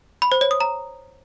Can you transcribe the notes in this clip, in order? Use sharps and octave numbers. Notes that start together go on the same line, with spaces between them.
B5
C5
C#5
D#6
A#5